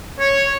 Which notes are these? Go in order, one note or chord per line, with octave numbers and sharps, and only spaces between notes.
C#5